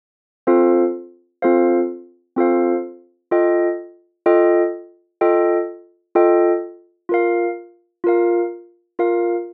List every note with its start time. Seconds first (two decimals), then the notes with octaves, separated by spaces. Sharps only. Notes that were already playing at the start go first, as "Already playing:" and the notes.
0.47 C4 F4 A4 C5 F5
1.42 C4 F4 A4 C5 F5
2.36 C4 F4 A4 C5 F5
3.31 F4 A4 D#5 G5
4.26 F4 A4 D#5 G5
5.21 F4 A4 D#5 G5
6.15 F4 A4 D#5 G5
7.09 F4 A#4 F5
8.04 F4 A#4 F5
8.99 F4 A#4 F5